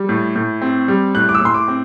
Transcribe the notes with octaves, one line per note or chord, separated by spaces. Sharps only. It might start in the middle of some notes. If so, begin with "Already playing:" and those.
Already playing: G3
A2
A2
C4
G3
A2 F#6
D6
E6
A2 C6
D6
C4